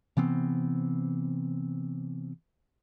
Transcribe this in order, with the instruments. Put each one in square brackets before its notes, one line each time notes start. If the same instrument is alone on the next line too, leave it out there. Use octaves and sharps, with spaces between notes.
[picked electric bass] C3 E3 B3 C4